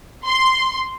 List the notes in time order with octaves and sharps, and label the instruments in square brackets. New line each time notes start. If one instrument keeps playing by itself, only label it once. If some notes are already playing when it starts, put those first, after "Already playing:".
[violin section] C6